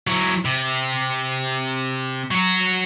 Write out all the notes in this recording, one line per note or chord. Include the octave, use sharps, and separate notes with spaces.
F#3 E4
C3
F#3 F#4